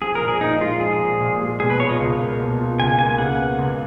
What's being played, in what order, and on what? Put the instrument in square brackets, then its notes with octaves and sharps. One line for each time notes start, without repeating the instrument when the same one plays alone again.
[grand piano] F3 [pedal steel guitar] G#4
[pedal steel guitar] A#4
[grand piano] A#2
[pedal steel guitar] G#4
[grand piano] A#2 [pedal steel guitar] D#4
[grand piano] G#3 [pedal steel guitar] F4
[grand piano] F3 [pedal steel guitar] G#4
[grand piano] A#2
A#2
G#3
[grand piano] B2 [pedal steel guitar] G#4
[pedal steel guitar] B4
[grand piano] F4 [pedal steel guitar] C#5
[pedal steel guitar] D#5
[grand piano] C#2
A#3
B2
F4
[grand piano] C#2 [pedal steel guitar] G#5
[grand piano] A#3 [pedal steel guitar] G#5
[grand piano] C#3 [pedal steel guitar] F#5
[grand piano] B3
C#2